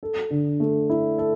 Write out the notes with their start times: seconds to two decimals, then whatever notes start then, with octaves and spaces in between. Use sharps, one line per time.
0.03 A4
0.31 D3
0.60 A3
0.90 E4
1.18 A4